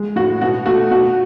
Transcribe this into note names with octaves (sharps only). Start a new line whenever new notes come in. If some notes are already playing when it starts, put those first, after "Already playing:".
Already playing: G#3
A2 F#4
B2 F#4
A3 F#4
B2 F#4